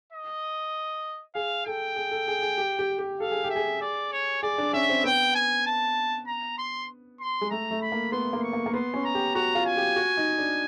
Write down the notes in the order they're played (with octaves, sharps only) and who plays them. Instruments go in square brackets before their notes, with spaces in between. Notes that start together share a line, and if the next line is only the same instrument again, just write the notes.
[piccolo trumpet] D#5
[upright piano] G#4 [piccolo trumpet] F5
[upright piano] A4 [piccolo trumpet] G5
[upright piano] G#4
A4
G#4
G#4
G4
G4
G4
[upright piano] A4 [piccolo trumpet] F5
[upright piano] G#4
G4
[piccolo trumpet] E5
[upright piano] G#4
[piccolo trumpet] D5
C#5
[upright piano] G#4 [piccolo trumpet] D5
[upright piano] D4
[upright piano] C#4 [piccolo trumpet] E5
[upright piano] C4
[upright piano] B3 [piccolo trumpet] G5
[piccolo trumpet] G#5
A5
A#5
C6
C6
[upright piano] G#3
[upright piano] A3 [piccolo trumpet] A#5
[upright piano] A3
[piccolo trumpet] B5
[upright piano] A#3
[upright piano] B3 [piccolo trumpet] C6
[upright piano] A#3
[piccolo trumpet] C#6
[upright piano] A#3
A#3
[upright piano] B3 [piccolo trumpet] C6
[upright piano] C#4
[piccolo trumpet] A#5
[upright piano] G4
[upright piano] F#4 [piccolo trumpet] A#5
[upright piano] F4
[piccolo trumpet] G#5
[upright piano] G4
F#4
D#4
D4